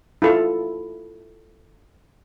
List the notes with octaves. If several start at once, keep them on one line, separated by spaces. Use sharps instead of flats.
E4 F4 A4